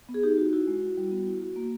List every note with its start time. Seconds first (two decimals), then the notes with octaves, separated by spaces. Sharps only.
0.09 B3
0.14 G#4
0.23 D#4 G4
0.38 F#4
0.53 E4 F#4
0.67 G#3
0.82 E4
0.98 G3
1.12 B3
1.27 E4
1.42 F#4
1.56 A#3